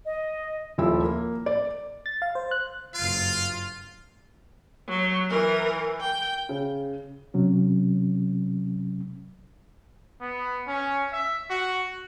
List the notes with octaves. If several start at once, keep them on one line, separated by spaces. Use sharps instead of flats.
D#5
D#1 F3 E4 E6
A#3
D5
A6
F5
C5
F#6
F#1 G2 F4 F5
F#3
E3 A#4
G5
C#3
C3 F#3 C#4
B3
C#4
E5
F#4